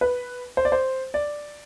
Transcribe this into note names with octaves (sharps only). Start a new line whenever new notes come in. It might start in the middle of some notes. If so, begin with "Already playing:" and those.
B4
C5
D5
C5
D5